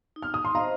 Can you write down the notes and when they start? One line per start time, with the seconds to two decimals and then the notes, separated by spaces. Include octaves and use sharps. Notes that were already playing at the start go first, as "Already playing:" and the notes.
0.16 D#4
0.22 F6
0.34 D#6
0.45 C6
0.55 C5 D#5 F5 A#5